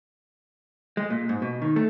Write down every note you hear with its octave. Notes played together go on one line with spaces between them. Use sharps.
G#3
A#2
G#2
B2
D#3
A3